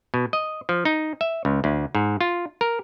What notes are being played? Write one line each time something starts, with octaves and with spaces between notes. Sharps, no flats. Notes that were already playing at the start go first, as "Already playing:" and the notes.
B2
D#5
F3
D#4
E5
C#2
D2
G#2
F4
A#4